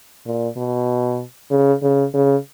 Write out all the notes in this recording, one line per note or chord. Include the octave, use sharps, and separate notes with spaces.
A#2
B2
C#3
C#3
C#3